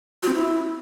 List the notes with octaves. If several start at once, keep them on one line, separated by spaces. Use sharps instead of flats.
F#4
C4
E4